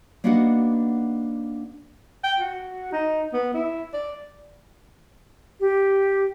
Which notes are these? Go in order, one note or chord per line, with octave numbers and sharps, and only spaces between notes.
A#3 B3 D4 D#4 F#4 F#5
G5
F#4
D#4
B3
E4
D5
G4